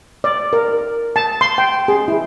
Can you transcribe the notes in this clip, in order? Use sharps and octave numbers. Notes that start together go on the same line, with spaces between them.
D5
A#4
A5
C6
G5
G#4
E4